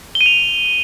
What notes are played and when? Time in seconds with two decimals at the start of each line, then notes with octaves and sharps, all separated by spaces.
0.15 G7
0.21 D#7
0.26 F7